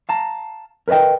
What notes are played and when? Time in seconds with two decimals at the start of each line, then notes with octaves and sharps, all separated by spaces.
0.09 F5 A5 A#5
0.88 A#4 B4 C#5 D#5 G5